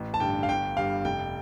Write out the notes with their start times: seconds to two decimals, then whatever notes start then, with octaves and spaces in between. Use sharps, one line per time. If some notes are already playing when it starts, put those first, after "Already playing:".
Already playing: A1
0.14 A5
0.20 G2 D3 G5
0.43 F5
0.49 G1 G5
0.77 G2 G3 F5
1.05 F1 G5